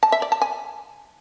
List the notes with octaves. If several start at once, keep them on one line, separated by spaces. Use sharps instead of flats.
A5
E5
D5
A5
G#5